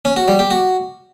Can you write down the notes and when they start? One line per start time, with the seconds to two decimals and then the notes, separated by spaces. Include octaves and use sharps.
0.05 C#4
0.16 F#4
0.28 G3
0.39 G4
0.51 F#4